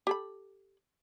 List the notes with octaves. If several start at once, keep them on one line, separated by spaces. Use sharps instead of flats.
G4 A4 B5